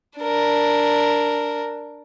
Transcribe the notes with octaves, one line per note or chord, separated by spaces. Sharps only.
D4 A#4